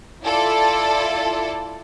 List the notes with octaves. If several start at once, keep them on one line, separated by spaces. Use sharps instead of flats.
E4 F4 A4 D5